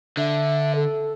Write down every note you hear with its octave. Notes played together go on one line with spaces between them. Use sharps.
D3 E5
A4